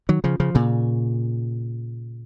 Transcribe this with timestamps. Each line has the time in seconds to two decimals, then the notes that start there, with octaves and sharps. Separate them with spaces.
0.09 D#3 F#3
0.24 C#3 F3
0.40 C#3 F3
0.55 A#2 C#3